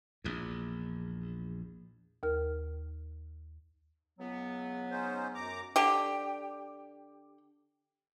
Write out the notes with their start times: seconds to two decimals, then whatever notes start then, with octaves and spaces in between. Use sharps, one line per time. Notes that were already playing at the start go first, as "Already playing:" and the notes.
0.24 A#1 E2
2.23 D#2 A#4 F6
4.19 C#2 F#3 B3
4.91 C#4 D#4 C5
5.34 F#2 A#5 D6
5.76 D3 G4